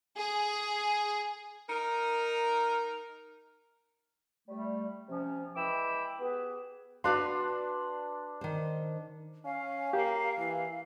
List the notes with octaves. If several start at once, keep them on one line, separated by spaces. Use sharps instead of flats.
G#4
D#4 A#4
G3 A3
C3 F3 C#4
E3 G#3 G5 B5 D6 E6
B3 G4 G#4 B4
D4 F#4 B4 F5 C6
D#3 C5
C#4 F5
A#3 G4
E3